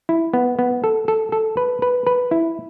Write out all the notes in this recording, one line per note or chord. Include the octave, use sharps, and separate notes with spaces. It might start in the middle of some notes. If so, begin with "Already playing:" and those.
E4
B3
B3
A4
A4
A4
B4
B4
B4
E4